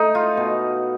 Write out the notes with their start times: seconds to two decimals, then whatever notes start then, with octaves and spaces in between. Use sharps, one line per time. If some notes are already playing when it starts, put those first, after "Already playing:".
Already playing: A3 D#4
0.15 F4
0.37 B2